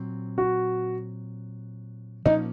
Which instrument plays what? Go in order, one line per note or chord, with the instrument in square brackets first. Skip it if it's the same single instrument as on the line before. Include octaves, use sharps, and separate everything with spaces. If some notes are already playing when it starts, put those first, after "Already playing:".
Already playing: [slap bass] A#2 F#3 C4
[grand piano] F#4
[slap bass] A#2 F3 A#3 C#4 [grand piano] D#4